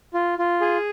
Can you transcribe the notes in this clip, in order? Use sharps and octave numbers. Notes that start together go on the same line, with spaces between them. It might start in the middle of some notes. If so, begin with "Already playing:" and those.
F4
F4
G#4